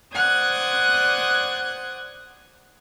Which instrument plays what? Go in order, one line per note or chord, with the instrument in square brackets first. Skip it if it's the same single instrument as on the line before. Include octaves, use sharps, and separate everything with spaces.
[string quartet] C5 D5 F#5 D#6 F#6 G#6